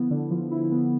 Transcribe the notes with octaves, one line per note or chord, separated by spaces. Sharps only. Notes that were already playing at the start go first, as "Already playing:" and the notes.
Already playing: D3 F3 B3 E4
D3
F3
E4
B3